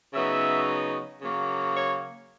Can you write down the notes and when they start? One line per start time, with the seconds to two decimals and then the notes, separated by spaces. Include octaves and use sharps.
0.14 C#3 F#3 B3 D#4 E5
1.22 C#3 F#3 A#3
1.75 C#5